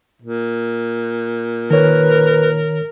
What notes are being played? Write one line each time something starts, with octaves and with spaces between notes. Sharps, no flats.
A#2
D#3 A#4 B4 C#5